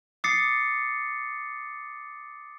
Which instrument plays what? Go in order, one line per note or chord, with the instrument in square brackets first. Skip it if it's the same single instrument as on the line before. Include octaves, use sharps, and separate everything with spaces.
[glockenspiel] D6 D#6 A6 C7 C#7